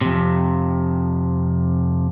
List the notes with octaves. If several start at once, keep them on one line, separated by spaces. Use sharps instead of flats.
F2 C3